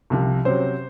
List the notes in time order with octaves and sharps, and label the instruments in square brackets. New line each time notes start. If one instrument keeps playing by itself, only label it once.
[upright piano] C2 C3 F3
C3 F#3 C#4 C5